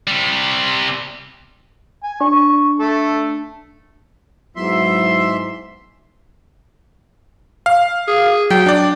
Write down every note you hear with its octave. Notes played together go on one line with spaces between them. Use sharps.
C3 G3
G#5
D4 C#6
A3 A4
G#2 F#3 B3 E4 E5 C6
F5
G#4
F#3 G5
D4 D5